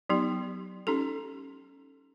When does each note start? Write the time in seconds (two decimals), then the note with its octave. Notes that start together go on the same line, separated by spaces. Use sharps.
0.09 F#3 B3 D#4 G4
0.87 C#4 D#4 G4 A4